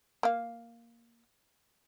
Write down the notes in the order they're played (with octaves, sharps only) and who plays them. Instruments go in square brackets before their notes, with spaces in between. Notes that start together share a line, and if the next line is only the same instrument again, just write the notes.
[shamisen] A#3 F5